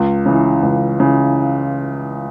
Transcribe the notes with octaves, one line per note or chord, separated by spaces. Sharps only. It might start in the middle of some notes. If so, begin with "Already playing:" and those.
Already playing: C#2
C#3 E3
C#2
C#3 E3